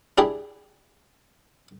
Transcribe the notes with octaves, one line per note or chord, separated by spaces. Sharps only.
D4 E4 G4 G#4